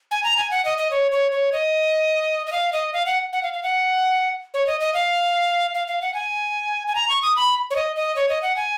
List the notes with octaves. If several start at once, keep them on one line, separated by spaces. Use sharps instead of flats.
G#5
A#5
G#5
F#5
D#5
D#5
C#5
C#5
C#5
D#5
D#5
F5
D#5
F5
F#5
F#5
F5
F5
F#5
C#5
D#5
D#5
F5
F5
F5
F#5
G#5
G#5
A#5
C#6
D#6
B5
C#5
D#5
D#5
C#5
D#5
F#5
G#5